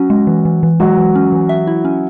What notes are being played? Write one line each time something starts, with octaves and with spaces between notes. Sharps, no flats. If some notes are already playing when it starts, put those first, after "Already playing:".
Already playing: F#3 C#4 F#4
G#3
E3
E3
E3
F#3 G#3 F#4
E3
C#4
E3
E5
E4
C#4